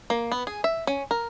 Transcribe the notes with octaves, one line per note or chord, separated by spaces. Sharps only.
A#3
B3
G#4
E5
C#4
A#4